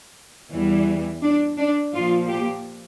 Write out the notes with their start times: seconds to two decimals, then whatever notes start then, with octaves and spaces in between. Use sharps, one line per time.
0.51 E2 E3 G3
1.22 D4
1.58 D4
1.94 A#2 F3 A#3 F4
2.30 G4